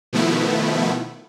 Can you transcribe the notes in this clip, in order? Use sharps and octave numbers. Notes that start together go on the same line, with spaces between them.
B2 D#3 F3 A3 B3 E4